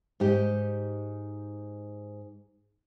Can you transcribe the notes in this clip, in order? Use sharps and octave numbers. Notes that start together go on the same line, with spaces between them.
G#2 D#4 G4